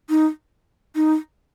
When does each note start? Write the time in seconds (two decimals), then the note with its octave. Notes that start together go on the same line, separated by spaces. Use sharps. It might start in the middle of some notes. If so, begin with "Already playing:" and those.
0.10 D#4
0.96 D#4